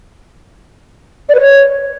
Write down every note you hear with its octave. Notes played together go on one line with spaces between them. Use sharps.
D5
B4
C#5